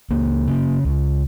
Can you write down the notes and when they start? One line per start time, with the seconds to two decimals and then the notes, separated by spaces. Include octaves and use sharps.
0.10 C#2 A#3
0.48 C#3
0.85 C#2